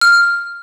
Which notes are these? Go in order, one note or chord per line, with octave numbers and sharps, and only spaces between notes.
F6